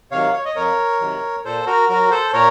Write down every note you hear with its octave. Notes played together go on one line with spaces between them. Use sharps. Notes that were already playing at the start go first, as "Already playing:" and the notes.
C3 D#3 F#3 C#5 F5
C#5
D#5
F2 A#4 C#5
C3 D#3 F#3
A#2 A4 C5
F#4 A#4
F#3 F#4 A#4
A4 C5
A#2 A#4 C#5